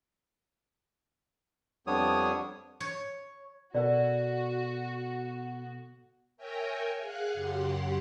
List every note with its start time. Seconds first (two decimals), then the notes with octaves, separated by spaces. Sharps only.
1.87 F2 G3 B3 D4 C#5 D#6
2.80 C#5
3.75 B2 B3 F#4 A4 A#4 D5 F#5
6.37 A#4 C#5 E5 G5 G#5 A#5
6.99 G#4 F5 F#5 F#6
7.34 F#2 C#3 G4 F#5 C6